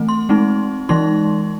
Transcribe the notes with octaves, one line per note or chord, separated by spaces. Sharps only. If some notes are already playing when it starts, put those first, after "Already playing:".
Already playing: E3 A3 C4
C6
G#3 C4 D#4
E3 G#3 D#4 C6